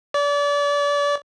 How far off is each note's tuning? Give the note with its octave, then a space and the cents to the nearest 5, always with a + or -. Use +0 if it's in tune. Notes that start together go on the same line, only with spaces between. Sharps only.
D5 -35